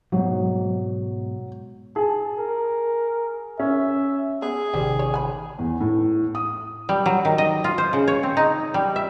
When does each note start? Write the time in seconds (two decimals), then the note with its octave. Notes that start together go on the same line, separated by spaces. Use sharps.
0.12 G#2 B2 F#3
1.96 G#4 A5
2.39 A#4
3.59 C#4 E5
4.42 B3 G#4
4.74 A1 C3 D#3 G3 C4 C#4
4.99 C#5
5.14 G#5 B5
5.59 E2
5.81 A2
6.35 D#6
6.89 G3
7.06 F#3
7.25 D#3
7.38 D#5
7.64 F4
7.78 C5
7.93 C#3
8.08 C#5
8.23 C4
8.37 D#4
8.74 G3
8.96 E5